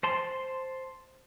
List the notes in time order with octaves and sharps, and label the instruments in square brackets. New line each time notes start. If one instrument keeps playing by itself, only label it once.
[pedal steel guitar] C5 A5 C6